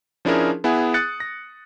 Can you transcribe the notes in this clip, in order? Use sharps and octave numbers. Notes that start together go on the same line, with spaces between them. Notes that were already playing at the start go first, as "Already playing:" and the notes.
F3 C#4 D4 E4 G#4 A#4
B3 E4 G#4 F#5 G#5
D#6 F#6 A6 C#7
A#6